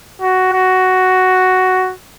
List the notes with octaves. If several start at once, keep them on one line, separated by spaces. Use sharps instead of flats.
F#4
F#4